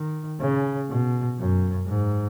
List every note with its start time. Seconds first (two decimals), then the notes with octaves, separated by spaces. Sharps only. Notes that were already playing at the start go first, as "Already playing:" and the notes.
Already playing: D#3
0.40 C#3
0.89 B2
1.38 F#2
1.87 G#2